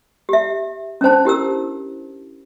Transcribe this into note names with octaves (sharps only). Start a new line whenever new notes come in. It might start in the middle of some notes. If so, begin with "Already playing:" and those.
G4 E5
C#4 D4 C5 A5
E4 G4 A#4 E6